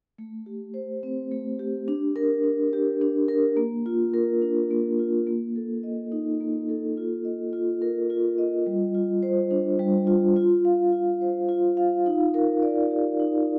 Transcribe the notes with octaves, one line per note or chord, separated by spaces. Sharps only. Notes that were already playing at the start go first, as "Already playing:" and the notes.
A3
G4
C5
C4
A3
G4
D4
A#4
D4
G4
D4
A#4
A#3
F4
A#4
D4
A#3
F4
A#3
A4
D#5
D#4
A#3
A4
F4
D#5
F4
A#4
F4
D#5
G3
F4
C5
D4
G3
F4
F4
F5
F4
C5
F4
F5
D#4
A#4
D5
G4
D#4